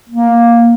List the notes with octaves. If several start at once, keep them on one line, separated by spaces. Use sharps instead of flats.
A#3